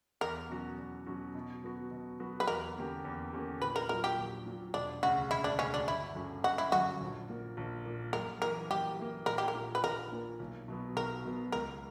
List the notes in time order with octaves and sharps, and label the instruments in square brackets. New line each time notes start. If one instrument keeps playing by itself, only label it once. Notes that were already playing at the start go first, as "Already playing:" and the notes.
[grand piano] E2 [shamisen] A#4
[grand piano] B2 F#3 C#4 F#4
E2
B2 F#3 C#4 F#4
B2
F#3 B3 F#4
B2
F#3 B3 F#4
[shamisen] B4
[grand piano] E2 [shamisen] A#4
[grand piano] D3 A#3 C#4 G4
E2
D3 A#3 C#4 G4
[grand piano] A#1 [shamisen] B4
[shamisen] A#4
[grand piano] A#2 F#3 [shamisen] A#4
[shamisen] G4
[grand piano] A#1
A#2 F#3
[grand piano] E1 [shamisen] D4
[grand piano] D2 C#3 [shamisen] F#4
[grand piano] E1 [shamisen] E4
[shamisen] D4
[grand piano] D2 C#3 [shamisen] C#4
[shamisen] D4
[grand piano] G1 [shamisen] E4
[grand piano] F#2 D3 F#3 C#4
[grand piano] G1 [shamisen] F#4
[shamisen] E4
[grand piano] F#2 D3 F#3 C#4 [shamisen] F#4
[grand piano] A#1
A#2 A#3
A#1
A#2 A#3
[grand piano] F#2 [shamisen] A#4
[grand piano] E3 A#3 [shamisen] A#4
[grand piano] F#2 [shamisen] G4
[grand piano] E3 A#3
[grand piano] A#1 [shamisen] A#4
[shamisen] G4
A#4
[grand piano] A#2 A#3
[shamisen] B4
[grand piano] A#1 [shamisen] A#4
[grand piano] A#2 A#3
B1
B2 F#3 B3
[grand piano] B1 [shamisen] A#4
[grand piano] B2 F#3 B3
[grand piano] C#2 [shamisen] A#4